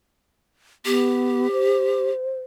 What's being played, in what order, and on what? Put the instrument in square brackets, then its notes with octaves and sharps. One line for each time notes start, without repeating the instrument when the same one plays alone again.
[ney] B3 [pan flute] G4
[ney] C5